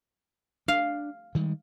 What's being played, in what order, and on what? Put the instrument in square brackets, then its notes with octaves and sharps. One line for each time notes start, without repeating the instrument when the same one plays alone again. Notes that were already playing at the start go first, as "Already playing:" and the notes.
[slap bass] D4 [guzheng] F5
[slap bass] D#3 G3 G#3